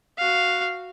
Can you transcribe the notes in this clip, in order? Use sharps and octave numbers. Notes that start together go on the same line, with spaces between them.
F#4 F5